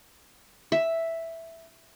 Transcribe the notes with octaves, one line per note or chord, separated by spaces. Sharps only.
E5